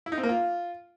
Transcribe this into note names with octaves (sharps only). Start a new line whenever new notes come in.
E4
D#4
C4
A#3
F4